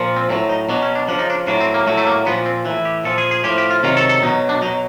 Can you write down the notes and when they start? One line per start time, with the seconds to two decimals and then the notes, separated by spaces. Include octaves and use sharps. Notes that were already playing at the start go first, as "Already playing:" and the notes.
Already playing: A#2 F3
0.16 C4
0.30 A2 F#3 C4
0.49 D#4
0.69 B2 F#3 D4
0.82 C#4
0.95 D4
1.08 C#3 F3 D4
1.19 D#4
1.30 D4
1.47 A2 F#3 D4
1.60 C4
1.74 A#3
1.87 A2 F#3 A3
1.98 A3
2.07 A#3
2.26 A#2 F3 B3
2.46 C4
2.65 A2 E3
2.85 G4
3.05 A#2 F3 A4
3.18 G#4
3.31 G#4
3.44 A2 F3 G4
3.58 G4
3.70 F4
3.83 C3 D#3 F#3 F4
3.97 A4
4.09 A4
4.23 B2 D#4
4.27 F#3
4.49 D4
4.62 F#3 D#4
4.66 B2